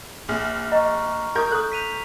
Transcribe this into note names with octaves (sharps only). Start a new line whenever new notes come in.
A#1 F6
D#5 A#5 C#6
G4 A#4 D6 D#6 G6
A4 D#6 F#6
B6 D#7 F7